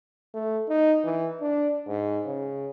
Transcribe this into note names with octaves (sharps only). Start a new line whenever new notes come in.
A3
D#4
E3
D4
G#2
C#3